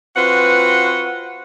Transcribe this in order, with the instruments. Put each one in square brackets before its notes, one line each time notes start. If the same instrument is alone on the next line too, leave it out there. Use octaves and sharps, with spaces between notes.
[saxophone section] C4 F4 F#4 B4 F#5